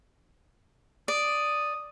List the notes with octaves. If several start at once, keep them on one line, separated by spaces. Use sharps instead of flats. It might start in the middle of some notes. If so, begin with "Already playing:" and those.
D5 D#6